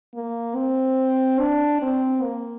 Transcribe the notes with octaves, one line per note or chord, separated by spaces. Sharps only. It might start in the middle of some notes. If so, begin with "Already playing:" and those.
A#3
C4
D4
C4
A#3